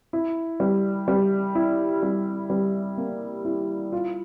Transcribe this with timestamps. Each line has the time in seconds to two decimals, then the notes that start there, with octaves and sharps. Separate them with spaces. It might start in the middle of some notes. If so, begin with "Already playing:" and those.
0.13 E4
0.60 G3
1.08 G3
1.55 E4
2.03 G3
2.50 G3
2.98 A#3
3.45 E4
3.92 F4